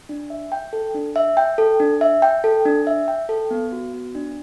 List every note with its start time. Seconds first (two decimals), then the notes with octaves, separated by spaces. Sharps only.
0.09 D4
0.30 E5
0.52 G5
0.73 A4
0.95 D4
1.16 E5
1.37 G5
1.58 A4
1.80 D4
2.01 E5
2.22 G5
2.44 A4
2.65 D4
2.87 E5
3.08 G5
3.29 A4
3.51 B3
3.72 F#4
3.94 B3
4.15 D4